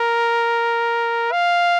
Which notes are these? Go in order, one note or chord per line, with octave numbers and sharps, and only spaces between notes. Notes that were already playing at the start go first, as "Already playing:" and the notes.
Already playing: A#4
F5